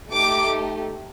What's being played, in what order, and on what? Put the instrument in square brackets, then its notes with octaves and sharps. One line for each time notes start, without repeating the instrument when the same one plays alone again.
[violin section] A3 D#4 G4 D6